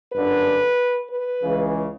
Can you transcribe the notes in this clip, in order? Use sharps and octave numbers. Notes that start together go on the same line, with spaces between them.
G1 F#2 D3 B4
B4
C#2 C#3 E3